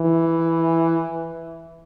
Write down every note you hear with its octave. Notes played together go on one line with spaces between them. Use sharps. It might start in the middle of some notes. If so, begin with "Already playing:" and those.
Already playing: E3